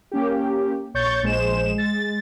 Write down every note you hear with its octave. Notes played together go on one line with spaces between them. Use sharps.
A#3 C#4 G4
A#1 C#5 C#6 G6 A6
A#1 G#3 C5 E7
G#3 A6